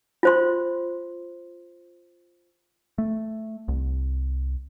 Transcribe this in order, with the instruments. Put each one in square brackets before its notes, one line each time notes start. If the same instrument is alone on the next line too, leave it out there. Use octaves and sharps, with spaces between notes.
[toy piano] F4 C5 C6
[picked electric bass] A3
C2